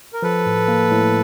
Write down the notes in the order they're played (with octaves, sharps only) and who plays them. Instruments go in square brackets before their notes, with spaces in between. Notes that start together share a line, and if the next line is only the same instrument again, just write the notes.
[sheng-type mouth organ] A#4
[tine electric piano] F3 [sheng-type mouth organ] A4 B4
[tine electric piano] A2
A#3
A2